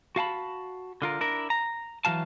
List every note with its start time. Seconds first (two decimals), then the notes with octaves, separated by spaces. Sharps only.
0.16 F#4 F5 A5 B5
1.02 D3 F4 A#4
1.21 D4 E4 A#4
1.50 A#5
2.05 E3 F#3 F5 A5